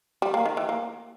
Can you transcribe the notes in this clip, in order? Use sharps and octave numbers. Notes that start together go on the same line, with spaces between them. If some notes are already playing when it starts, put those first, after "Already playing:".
G3
A#3
D#3
E3
A#3